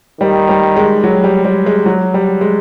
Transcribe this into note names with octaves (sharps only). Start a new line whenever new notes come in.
D#3 G3
G3
G#3
F#3
G3
G3
G#3
F#3
G3
G#3